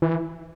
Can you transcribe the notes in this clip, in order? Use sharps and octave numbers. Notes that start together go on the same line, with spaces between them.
E3